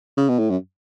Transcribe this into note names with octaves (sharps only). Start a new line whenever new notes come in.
C#3
B2
A2
F#2